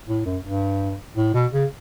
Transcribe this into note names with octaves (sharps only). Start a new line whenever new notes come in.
A2
F#2
G2
A2
B2
C#3